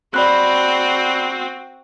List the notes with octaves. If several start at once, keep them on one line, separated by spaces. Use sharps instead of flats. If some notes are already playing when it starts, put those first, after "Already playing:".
C4 F#4 D5 B5 F#6